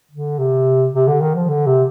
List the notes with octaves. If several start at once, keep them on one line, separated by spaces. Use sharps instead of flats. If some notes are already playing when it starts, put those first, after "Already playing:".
D3
C3
C3
D3
D#3
F3
D3
C3